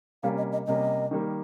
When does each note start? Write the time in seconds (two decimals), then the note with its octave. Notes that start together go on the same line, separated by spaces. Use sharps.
0.23 C3 G3 A#3 C#4 F5
0.37 D#5
0.52 D#5
0.67 C3 G3 A#3 C#4 D#5
1.11 D#3 G3 A#3